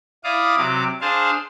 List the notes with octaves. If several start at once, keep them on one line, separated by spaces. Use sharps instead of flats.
E4 D5 F5 D6 D#6
C3 F#3 D6
D4 G#4 C5 F5 G#5 A5